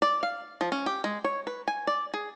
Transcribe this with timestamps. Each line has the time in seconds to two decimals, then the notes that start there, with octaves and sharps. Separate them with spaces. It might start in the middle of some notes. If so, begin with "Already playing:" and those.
0.02 D5
0.23 F5
0.61 F3
0.72 C#4
0.86 G4
1.04 G#3
1.24 C#5
1.47 B4
1.68 G#5
1.87 D5
2.14 G#4